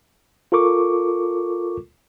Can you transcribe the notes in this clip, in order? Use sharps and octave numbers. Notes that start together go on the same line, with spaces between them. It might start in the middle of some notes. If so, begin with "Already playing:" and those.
F4 A4 A#4 C#6 D6